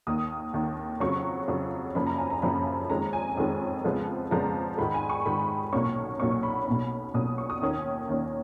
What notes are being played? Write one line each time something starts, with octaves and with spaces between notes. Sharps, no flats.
D#2 D#3 A#3 D#6
D#2 D#3 A#3
F2 C#3 F#3 C#6
F2 C#3 F#3
F#2 C#3 F3 A#3 C#4 B5
A#5
G#5
A#5
F#2 C#3 F3 A#3 C#4 B5
F2 D#3 G#3 C#4 A#5
G#5
F2 D#3 G#3 C#4
F2 C#3 F3 G#3 B3
F2 C#3 F3 G#3 B3 A#5
G#2 D#3 G#3 B5
G#5
C#6
G#2 D#3 G#3 B5
B1 A#2 F#3 A#3 C#4 C#6
B1 A#2 F#3 A#3 C#4 C#6
B5
B1 B2 A#3 C#4
B1 B2 A#3 C#4 D#6
C#6
D#6
D#2 D#3 A#3 C#4
D#2 D#3 A#3 C#4